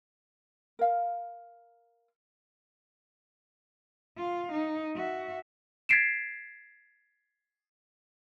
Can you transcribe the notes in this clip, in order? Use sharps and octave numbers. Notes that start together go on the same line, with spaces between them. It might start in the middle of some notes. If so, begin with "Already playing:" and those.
A#4 F5
F4 F5
D#4
F#4 E5
G#6 A6 B6 C7 D7 E7